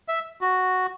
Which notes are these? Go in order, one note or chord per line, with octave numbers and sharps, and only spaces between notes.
E5
F#4